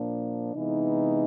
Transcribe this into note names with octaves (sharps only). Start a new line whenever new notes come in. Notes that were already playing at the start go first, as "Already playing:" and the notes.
Already playing: A#2 F3 A#3 D4
C3 E3 G#3 B3 D#4